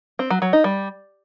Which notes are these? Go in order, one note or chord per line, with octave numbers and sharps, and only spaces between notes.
C4
F#3
F#3
D#4
G3